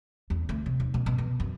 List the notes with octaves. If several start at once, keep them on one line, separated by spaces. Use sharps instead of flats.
E2
D2
C3
D#2
B2
B2
B2
F#2